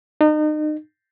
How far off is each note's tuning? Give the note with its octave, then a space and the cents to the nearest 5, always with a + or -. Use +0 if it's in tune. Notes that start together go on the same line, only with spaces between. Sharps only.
D#4 -35